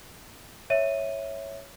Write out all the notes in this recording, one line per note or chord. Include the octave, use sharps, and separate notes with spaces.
C#5 E5 D#7